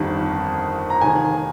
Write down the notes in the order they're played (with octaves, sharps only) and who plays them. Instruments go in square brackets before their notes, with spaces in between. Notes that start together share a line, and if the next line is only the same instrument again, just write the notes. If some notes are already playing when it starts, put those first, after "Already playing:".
Already playing: [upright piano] G1 F2 D#3 G3
A#5
F1 D#2 D#3 G#5